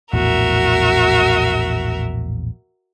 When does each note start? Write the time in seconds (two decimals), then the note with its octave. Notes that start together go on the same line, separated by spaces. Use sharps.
0.13 A#1 E2 A2 F#4 A#4 E5